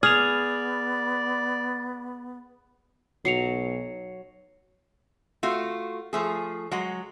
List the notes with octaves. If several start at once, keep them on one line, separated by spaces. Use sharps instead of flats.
B3 G#4 D5 F6 F7
B1 F#3 C7 C#7 F7
A3 F4 F#4
F3 A3 G#4
F#3 G#3 F#5